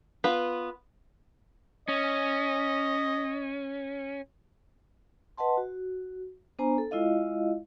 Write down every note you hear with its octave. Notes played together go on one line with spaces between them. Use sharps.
B3 F4 B4
C#4 D#5
B4 D#5 F#5 A5 C6
F#4
B3 D4 C5 G#5 A#5
A4
G#3 E4 F4 D#5 F5